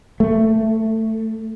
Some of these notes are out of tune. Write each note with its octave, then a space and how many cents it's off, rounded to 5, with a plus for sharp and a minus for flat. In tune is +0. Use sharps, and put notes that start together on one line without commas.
A3 +10